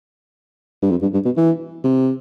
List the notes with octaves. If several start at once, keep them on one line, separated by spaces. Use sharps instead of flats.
G2
F2
G2
G2
B2
E3
C3